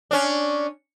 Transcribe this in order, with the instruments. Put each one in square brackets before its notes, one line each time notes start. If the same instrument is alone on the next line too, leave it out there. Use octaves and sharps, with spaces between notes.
[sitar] C#4 D4